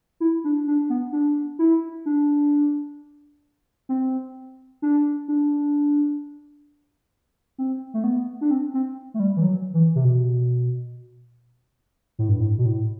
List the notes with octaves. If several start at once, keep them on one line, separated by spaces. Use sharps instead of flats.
E4
D4
D4
B3
D4
E4
D4
C4
D4
D4
C4
A3
B3
D4
C4
C4
A3
G3
E3
F#3
E3
C3
B2
A2
G2
A2
B2
A2